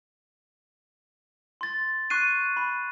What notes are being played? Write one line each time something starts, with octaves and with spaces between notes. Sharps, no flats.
C6 A6
C#6 F#6 C7 D#7
B5